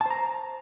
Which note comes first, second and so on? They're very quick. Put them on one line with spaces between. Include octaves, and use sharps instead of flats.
A5 C5 A#5